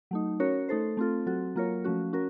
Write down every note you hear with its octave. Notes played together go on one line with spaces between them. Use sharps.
F#3 A3 D#4
C#4 F#4 A#4 C#5
A3 D#4 A4 C5
A3 C4 F4 A4
F#3 C4 F#4 A4
F#3 A#3 F4 A#4 C#5
F3 A3 C#4 F#4
C#4 F#4 A#4